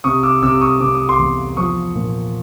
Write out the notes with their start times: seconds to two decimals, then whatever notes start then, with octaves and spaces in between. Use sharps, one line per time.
0.04 C3 C#6 D#6
0.23 D6 E6
0.42 C3 D6 E6
0.61 C#6 D#6
0.81 C3 D6
0.95 D#6
1.09 C6 D6
1.19 E2
1.57 F3 C#6 D#6
1.95 A#2